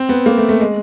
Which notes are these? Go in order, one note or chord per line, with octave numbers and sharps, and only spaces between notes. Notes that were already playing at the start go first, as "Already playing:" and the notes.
Already playing: C4
B3
A#3
A3
A3
G#3